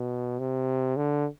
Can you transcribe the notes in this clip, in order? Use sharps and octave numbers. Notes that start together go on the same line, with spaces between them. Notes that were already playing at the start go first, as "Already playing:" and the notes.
Already playing: B2
C3
D3